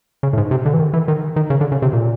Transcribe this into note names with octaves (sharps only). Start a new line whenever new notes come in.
C#3
A2
G#2
C3
D3
E3
D#3
E3
D#3
D#3
C#3
D3
C#3
C3
A#2